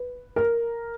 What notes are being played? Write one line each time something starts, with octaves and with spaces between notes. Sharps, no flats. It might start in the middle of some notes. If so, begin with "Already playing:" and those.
Already playing: B4
A#4